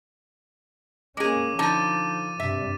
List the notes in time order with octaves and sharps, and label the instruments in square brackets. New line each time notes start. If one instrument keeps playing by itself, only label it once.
[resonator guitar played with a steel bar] G#3 G#4 [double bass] A#3 C#4 [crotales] D6 D#7
[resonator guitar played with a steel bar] D3 D#4 A5 [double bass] F3 [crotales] D6 A6 D#7
[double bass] G2 C3 [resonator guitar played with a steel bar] E5